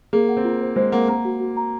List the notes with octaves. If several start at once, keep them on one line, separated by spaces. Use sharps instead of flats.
A#3 G#4
F#5
C4
F4
C5
G#3 C5
A#3 F#5
A#3 A#5
F#4
F#4
A#5